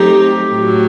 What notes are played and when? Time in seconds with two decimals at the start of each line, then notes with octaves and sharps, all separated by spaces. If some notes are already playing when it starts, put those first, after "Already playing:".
Already playing: F#3 A3 C4 D#4 G4
0.55 A2 F#3